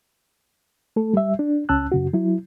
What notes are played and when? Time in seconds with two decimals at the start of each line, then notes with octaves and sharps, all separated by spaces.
0.96 A3 A4
1.14 G3 E5
1.39 D4
1.69 C#2 C#4 A5 E6 F#6
1.92 F#2 C#3 F#4
2.13 F#3 E4